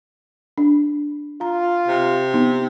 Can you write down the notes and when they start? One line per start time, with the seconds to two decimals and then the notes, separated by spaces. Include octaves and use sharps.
0.58 D4
1.41 F4 A#5
1.88 C3
2.34 B3 D#4